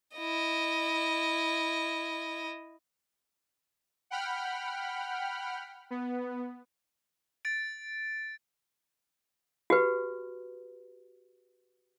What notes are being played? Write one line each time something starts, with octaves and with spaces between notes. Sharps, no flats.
E4 D#5
F#5 G5 B5 F6
B3
A6 D7
F#4 G4 B4